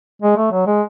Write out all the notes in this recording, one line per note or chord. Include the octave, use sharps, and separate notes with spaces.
G#3
A3
F#3
G#3